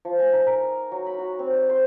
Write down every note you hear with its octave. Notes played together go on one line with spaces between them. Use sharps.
F3
G#5
D#4
A#4
A#4
F#3
B5
F#4
C4
D5
C5